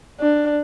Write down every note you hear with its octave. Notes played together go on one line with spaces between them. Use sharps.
D4